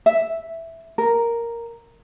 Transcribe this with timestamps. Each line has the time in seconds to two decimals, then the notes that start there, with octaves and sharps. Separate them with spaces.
0.06 E5
0.98 A#4